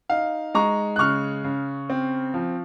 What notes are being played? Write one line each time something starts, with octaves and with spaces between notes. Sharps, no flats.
D#4 F5
G#3 A#5 C#6
F#6
C#3 C#6 F6
C#3
C4
F3